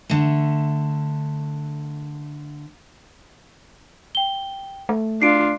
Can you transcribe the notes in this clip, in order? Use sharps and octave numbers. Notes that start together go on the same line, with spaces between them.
D3 A3
G5 G7
A3
D4 F4 C7 D7